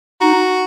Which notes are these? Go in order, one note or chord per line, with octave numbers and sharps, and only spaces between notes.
D#4 F#4